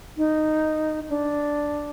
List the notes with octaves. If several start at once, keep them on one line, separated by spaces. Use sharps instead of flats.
D#4
D4